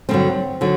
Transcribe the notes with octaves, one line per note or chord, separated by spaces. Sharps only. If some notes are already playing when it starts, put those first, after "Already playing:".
G2 D3 F#3 C4
D3 F#3